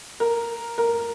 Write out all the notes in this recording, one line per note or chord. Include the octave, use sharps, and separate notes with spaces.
A#4
A#4